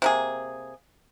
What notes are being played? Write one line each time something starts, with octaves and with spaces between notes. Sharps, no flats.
C3 A#3 G#4